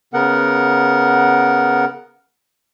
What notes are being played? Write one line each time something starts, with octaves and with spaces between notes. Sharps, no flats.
C#3 B3 A#4 F#5